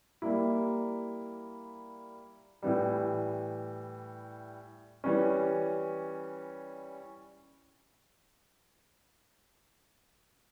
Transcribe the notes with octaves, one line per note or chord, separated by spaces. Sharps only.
G3 A#3 E4
A2 E3 G3
E3 G3 C#4